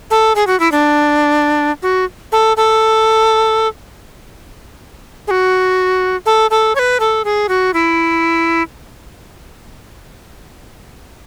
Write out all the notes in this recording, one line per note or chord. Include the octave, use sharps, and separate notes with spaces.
A4
G#4
F#4
E4
D4
F#4
A4
A4
G#4
F#4
A4
A4
C#5
B4
A4
G#4
F#4
E4